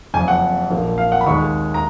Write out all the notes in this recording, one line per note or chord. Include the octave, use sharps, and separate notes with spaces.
F#1 F2 F3 G#5
F#5
A#1 A#2 F3 A#3
F5
F#5
B5
D#2 D#3 G#3 C#6
A#5